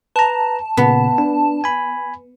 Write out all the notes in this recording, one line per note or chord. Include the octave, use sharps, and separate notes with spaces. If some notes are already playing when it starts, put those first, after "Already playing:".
B4 A5 A#5
A#2 C#3 B3
D4
G#5 B5